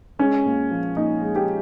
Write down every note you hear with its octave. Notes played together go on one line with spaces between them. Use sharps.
G#3 C#4
A#2
F3
A#2 D#4
G#3
G4